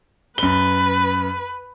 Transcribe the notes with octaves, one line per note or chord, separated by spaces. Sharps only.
F#2 B4 G7